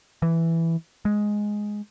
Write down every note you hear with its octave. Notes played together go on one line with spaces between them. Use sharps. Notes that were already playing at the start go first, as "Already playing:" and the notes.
E3
G#3